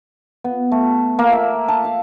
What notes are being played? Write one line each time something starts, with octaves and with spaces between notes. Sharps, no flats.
B3
A3
A#3
E5
A5
F5